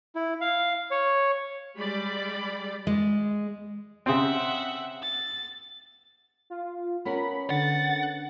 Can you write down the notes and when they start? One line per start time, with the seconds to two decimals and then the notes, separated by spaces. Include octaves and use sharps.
0.15 E4
0.41 F5
0.91 C#5
1.78 G3 G#3 D5 B5
2.87 G#3
4.06 C#3 C4 E5 F#5
5.02 A6
6.50 F4
7.05 B3 C#4 A#4 B5
7.50 D3 F#5 A6